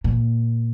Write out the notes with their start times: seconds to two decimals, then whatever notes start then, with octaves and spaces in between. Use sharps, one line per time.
0.04 A#2